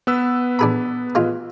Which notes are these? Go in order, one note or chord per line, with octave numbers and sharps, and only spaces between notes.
B3 B4 E6
D4 G#4 B5
G#3 F4